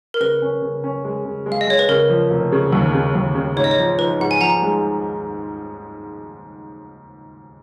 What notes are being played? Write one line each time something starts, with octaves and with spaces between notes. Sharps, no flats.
A#4
C#3 B4
C#4
C#3
C#4
G#3
C#3
G#3
F5
D#5
G#3 C#5
B4
C#3 A#4
F3
F1
C#3
D#2
C#3
D#2
C#3
G#2 C#5
D#5
C#5
F3
F3 B4
G#2 F#5
G#5
F3 F#5 A#5
G#3